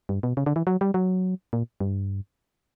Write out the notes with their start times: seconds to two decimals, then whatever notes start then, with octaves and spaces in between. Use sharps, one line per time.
0.09 G2
0.23 B2
0.37 C#3
0.46 D3
0.56 E3
0.67 F#3
0.81 G3
0.94 F#3
1.53 A#2
1.81 G2